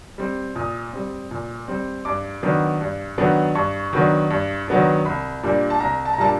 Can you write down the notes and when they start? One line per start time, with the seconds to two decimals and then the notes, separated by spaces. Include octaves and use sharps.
0.18 G3 C4
0.55 A#2 D#6
0.93 G3 C4
1.31 A#2
1.68 G3 C4
2.05 G2 D6
2.43 D#3 F#3 B3 D4
2.81 G2
3.18 D#3 F#3 B3 D4
3.55 G2 C#6
3.93 D#3 F#3 B3 D4
4.30 G2
4.68 D#3 F#3 B3 D4
5.05 C2 B5
5.43 A#2 G3 A#3 D4
5.70 A5
5.80 C2 A#5
6.05 A5
6.13 A#5
6.18 A#2 G3 A#3 D4 A5